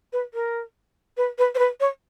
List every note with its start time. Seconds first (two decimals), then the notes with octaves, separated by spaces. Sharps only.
0.13 B4
0.34 A#4
1.17 B4
1.38 B4
1.55 C5
1.59 B4
1.80 C#5